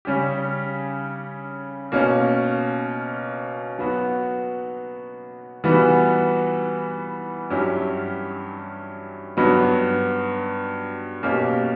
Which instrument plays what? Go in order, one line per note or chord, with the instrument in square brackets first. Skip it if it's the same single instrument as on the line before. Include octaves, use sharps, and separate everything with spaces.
[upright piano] C#3 G3 C#4 G4
B2 A#3 C#4
F#3 B3 F#4
E3 G3 B3 F#4
G2 F#3 C#4 E4 G4
G2 F#3 B3
B2 A#3 C#4 G4